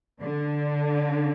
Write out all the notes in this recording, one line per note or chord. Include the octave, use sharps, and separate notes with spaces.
D3